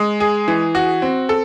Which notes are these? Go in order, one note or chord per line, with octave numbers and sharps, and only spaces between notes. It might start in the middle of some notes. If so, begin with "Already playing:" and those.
Already playing: G#3
G#4
E3
F#4
C4
A4